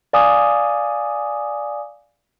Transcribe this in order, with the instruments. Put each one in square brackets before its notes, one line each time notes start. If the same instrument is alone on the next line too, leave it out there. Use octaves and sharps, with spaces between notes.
[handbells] D5 F5 G#5 D6 D#6